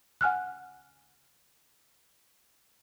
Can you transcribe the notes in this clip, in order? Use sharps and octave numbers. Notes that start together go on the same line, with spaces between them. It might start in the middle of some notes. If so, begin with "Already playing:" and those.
F#5 G#5 F6 F#6